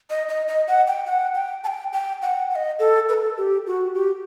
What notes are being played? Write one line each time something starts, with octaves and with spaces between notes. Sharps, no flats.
D#5
D#5
D#5
F#5
G5
F#5
G5
A5
G5
G5
F#5
F#5
D#5
A4
B4
A4
G4
F#4
G4